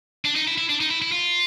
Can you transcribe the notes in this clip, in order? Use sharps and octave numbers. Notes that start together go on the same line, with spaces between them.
D4
D#4
E4
E4
D4
D#4
E4
E4
F4